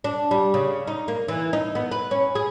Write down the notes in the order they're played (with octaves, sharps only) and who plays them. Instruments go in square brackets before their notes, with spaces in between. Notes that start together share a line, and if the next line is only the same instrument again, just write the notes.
[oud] D4
G3
C#3
D#4
A#3
E3
D#4
B3
B4
C#4
G#4